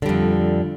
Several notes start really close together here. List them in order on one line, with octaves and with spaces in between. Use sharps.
D3 G3 F2